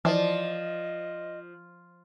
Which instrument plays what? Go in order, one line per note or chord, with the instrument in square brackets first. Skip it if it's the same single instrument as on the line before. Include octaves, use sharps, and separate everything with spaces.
[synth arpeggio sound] E3 [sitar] F3 [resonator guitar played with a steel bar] D5 [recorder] D#5